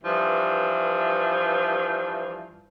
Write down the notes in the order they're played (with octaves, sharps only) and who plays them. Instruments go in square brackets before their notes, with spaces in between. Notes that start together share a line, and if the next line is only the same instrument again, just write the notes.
[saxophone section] G2 E3 F3